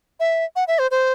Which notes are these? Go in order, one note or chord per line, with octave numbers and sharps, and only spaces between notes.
E5
F#5
E5
C5
C5